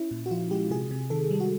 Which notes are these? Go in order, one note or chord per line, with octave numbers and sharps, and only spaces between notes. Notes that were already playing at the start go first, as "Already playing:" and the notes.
Already playing: C#4 E4
A#2
F#4
F3 F4
G#3 G4
C3 G#4
C3
D#3 A4
G3
F#4